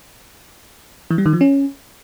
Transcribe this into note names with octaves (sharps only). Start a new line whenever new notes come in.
E3
G3
D#3
F3
C#4